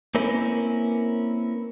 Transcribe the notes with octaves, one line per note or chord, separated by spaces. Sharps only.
A#3 C4 C#4 E4 A#4 B4